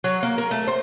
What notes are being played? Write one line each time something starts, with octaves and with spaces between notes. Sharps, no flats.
F#3
A#3
A#4
A3
C5